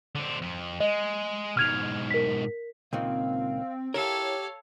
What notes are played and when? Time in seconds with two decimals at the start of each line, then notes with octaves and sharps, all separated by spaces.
0.15 D3 C4
0.42 F2
0.80 G#3 D#5
1.57 G#2 B2 F6 G#6 F7
2.11 A#4 B6
2.93 C#2 A#2 D#3 C4 F5
3.94 E4 G4 A4 A#4 C#5 F5